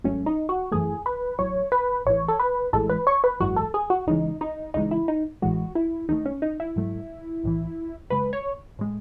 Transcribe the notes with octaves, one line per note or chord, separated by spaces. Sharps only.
G#1 G#2 F#3 A3 C#4
D#4
F#4
F#2 E3 A3 G#4
B4
A1 A2 F#3 C#5
B4
A1 A2 E3 C#5
A4
B4
A1 A2 E3 G#3 A4
B4
C#5
B4
G#1 F#2 E3 G#3 F#4
A4
G#4
F#4
C#2 C#3 E3 G#3 D#4
D#4
C#2 C#3 E3 G#3 D#4
E4
D#4
A1 A2 E3 G#3 F#4
E4
D#2 D#3 A3 D#4
C#4
D#4
E4
G#2 F#3 A3
B1 A2 E3
F#2 C#3 G#3 B4
C#5
A2 G#3